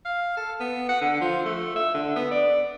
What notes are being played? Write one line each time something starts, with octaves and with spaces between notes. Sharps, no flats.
F5
A4
B3
F#5
D3
F3
A3
E5
D3
B3
D5